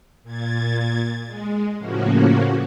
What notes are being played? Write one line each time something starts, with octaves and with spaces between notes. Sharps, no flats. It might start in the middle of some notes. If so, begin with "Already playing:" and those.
A#2 G#6 A6
G#3
A2 C#3 F3 A#3 C#4 F#4